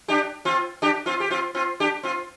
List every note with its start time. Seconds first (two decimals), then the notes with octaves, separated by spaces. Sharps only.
0.08 D4 G4
0.45 C4 F4
0.82 D4 G4
1.06 C4 F4
1.20 G4
1.30 C4 F4
1.55 C4 F4
1.80 D4 G4
2.03 C4 F4